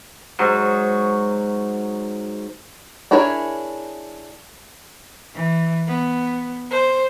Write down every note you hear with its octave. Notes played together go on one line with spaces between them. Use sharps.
G#2 F#3
D4 E4 G#4 A#4 C#5
E3
B3
C5